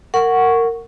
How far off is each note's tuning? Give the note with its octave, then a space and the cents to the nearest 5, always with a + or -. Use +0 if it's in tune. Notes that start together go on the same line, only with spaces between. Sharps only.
A#4 -20 F#5 +0 C#6 +0